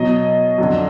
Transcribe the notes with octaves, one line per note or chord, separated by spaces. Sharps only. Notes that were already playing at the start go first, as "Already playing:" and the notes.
Already playing: B2 F#3 D#5
F2 D3 F#3